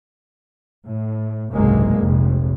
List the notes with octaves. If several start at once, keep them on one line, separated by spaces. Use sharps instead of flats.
A2
F#1 C2 G#2 D3 G#3 A#3
F1 A#1 F2